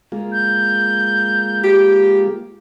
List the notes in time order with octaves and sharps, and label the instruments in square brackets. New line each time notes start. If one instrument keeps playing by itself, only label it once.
[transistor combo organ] G#3 A#3 F4
[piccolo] G6
[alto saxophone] G4